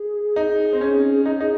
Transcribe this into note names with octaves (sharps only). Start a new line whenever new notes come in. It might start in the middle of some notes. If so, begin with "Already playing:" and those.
Already playing: G#4
D#4
C4
C#4
D#4 G#4
D#4